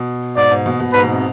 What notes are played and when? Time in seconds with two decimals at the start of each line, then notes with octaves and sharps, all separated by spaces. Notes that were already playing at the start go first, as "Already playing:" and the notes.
Already playing: B2
0.37 G#2 D5
0.51 G#2
0.66 B2
0.80 B2
0.93 G#2 B4
1.03 B2
1.12 C3